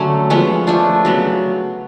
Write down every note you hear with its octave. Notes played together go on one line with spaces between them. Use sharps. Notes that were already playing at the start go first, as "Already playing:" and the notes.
Already playing: D3 F#3 A3 C#4
F3 G#3 B3 C#4
F3 A3 D4
C#3 F#3 B3